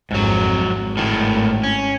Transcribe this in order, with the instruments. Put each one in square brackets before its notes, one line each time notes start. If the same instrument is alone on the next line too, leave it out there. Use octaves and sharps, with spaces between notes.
[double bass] G#1 F2 [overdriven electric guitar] G#2 F#3
[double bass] G#1
[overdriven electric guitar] A2 D#3
C#4